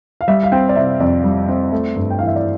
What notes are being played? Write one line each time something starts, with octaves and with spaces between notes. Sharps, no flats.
F5
G3 E5
F5
C4 G5
D5
C3 E5
F2 D5
G3
C4
A3
G2
G5
E3 F5
E5
D5